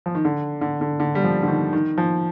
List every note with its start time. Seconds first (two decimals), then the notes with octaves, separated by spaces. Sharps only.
0.06 F3
0.15 D#3
0.25 D3
0.61 D3
0.81 D3
1.00 D3
1.15 G3
1.24 F3
1.43 D3
1.48 D#3
1.73 D#3
1.98 F3